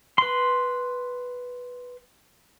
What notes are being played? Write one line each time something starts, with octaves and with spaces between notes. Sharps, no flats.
B4 C6